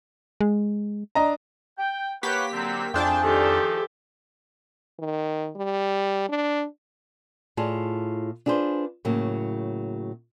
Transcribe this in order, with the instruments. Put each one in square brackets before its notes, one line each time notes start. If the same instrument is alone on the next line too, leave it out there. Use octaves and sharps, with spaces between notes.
[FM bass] G#3
[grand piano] D4 D#5 A#5
[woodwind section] G5
[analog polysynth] A#3 G4 B6 [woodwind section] B4 C#5 F#5
[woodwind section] D3 F#3 C4
[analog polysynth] F2 D4 A5 [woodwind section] F4 G5 [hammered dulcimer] G#4 C5 E5
[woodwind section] D#3 F3 D#4 [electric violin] G4 A4
[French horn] D#3
G3
D4
[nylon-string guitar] A2 F4 G#4 D5 A5
D4 F4 G#4 B4 C5
A2 C#3 F#3 A#3